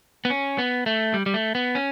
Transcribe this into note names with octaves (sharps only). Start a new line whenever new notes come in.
B3
C#4
B3
A3
G3
G3
A3
B3
C#4